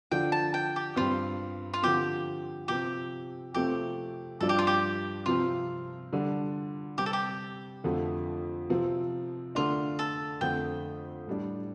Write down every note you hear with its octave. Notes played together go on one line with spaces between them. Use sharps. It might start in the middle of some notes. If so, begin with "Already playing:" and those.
D3 F3 D4 G5
A5
G5
G4
G2 G3 C4 F4
F4
D3 F3 C4 G4
C3 F3 C4 G4
C3 F3 A3 C4 G4
G2 F3 D4 A4
G4
F4
G4
C3 F3 C4 F4
D3 G3 D4
C3 G3 C4 G4
A4
G4
F2 D3 F3 A3
C3 F3 C4
D3 A3 D4 F4
A4
F2 D3 A3 C4 G5
A2 G3 D4